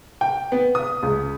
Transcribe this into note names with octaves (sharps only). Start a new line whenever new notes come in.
G5
B3
D#6
C#2